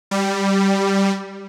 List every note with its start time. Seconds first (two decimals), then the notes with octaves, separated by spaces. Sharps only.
0.11 G3